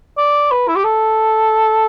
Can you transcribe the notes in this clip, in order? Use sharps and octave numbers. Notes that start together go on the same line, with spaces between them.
D5
B4
E4
G4
A4